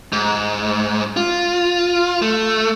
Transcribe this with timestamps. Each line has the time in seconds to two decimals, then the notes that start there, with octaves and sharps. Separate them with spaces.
0.13 G#2
1.17 F4
2.22 A3